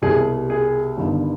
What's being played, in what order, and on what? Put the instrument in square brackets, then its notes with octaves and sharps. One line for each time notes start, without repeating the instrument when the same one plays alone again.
[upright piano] C2 B2 G3 G#4
G#4
G1 G2 D#3